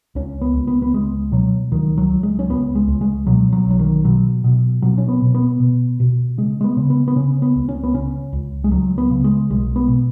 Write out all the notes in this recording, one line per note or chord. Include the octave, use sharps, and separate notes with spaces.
C#2 C#4
B3
C#2
B3
B3
C#2 G#3
B2 F#3
C#2 D#3
F#3
C#2
G#3
C#4
C#2 B3
G#3
C#2
G#3
B2 F#3
F#3
B1 F#3
D#3
B2 F#3
B2
B2 F#3
C#4
B3
B2
B3
B2
B2
C#3 G#3
G#3
B3
C#3
B3
B3
C#3 C#4
B3
C#2
C#4
B3
C#3 C#4
C#2
G#3
C#2 F#3
B3
C#3
G#3
B1 G#3
B3
B2